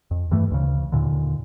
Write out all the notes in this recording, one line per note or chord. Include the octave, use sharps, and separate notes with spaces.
F2
G2 E3 A3
D2 C#3
D#2 A#2 D3